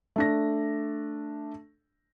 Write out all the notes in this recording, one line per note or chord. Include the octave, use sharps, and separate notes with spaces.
A3 D4 A#6